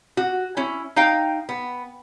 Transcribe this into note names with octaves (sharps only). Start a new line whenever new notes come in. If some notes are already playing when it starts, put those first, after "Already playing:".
F#4
C#4 E4
D#4 F5 G5
B3